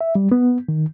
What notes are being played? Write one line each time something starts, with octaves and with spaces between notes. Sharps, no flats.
E5
G3
B3
D#3